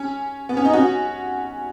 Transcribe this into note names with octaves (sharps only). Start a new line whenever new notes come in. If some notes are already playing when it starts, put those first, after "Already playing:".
Already playing: C#4
B3
C#4
D#4
C#4 F#4